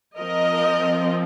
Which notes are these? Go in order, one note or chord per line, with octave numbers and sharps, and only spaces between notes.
F3 C4 A#4 D#5